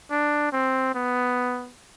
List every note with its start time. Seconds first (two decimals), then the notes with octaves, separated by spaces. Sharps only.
0.11 D4
0.53 C4
0.95 B3